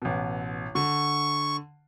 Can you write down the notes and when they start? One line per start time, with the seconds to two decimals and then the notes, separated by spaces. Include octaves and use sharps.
0.02 A1 B2
0.75 D3 C#6